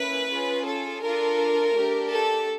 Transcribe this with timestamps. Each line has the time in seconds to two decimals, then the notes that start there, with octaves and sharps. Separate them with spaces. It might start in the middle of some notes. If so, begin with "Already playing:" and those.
Already playing: A#3 C#4 E4 B4
0.30 C#4 F4 G#4
0.65 A4
1.02 D4 F4 A4 A#4
1.74 A3 D4 G4
2.10 A4